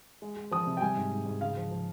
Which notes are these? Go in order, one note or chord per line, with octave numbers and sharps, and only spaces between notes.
G#3
G#3
F3 D#6
C3
G5
G3 G#5
G#2
G#2
G#2
C#3 F5
F3
F3